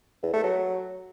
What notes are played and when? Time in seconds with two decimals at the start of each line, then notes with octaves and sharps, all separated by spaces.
0.23 E2
0.33 A3
0.44 F#3